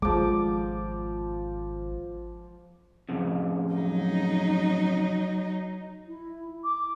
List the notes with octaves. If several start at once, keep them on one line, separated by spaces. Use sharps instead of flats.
G#1 F3 G#3 D6
F2 A2 C#3
F#3 D#4
E4
D6